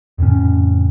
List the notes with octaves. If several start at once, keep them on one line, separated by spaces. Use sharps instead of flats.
F2 A2 C#3 C#4